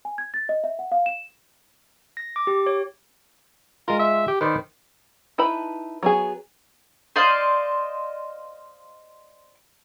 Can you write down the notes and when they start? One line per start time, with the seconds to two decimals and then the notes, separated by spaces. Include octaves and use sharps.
0.05 G#5
0.18 G#6
0.34 A6
0.49 D#5
0.64 E5
0.79 F#5
0.92 F5
1.06 E7
2.17 A#6
2.36 D6
2.47 G4
2.66 C#5
3.88 G#3 F4 A#4
3.99 E5
4.28 G4
4.41 D#3 B4 C5 D5
5.38 D#4 E4 B4 A5 B5
6.03 F#3 B3 G#4
7.16 C5 D5 D#5 F5